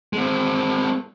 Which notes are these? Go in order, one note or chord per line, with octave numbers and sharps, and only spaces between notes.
G#3 C4